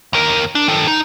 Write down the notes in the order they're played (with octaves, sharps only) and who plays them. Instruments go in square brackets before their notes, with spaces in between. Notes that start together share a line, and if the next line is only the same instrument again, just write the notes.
[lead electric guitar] D#2 A#4
D4
D#3 A4
D#4